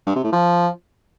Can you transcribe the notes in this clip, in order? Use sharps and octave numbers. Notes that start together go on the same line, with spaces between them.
G2
C3
A2
F3